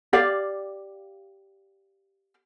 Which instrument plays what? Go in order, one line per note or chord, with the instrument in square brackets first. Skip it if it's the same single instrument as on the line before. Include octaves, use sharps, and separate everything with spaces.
[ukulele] G4 D5 F5